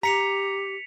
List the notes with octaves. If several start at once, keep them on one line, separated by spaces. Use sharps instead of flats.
G4 A#5 B6 C#7 F7